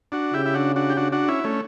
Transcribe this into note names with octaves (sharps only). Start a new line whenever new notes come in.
D4 F#4
C#3 E4 G4
E4
D4 F#4
D4 F#4
G4
D4 F#4
D4 F#4
C#4 E4
A3 C#4